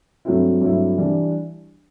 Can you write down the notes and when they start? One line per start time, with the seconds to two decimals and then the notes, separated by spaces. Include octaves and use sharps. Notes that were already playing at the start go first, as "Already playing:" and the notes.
0.25 G2 F#3 A3 C4 E4
0.61 G2 F#3 A3 C4 E4
0.98 E3 G3 D4